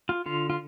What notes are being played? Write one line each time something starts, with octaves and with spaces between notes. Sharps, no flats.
F4
D3 F4
F4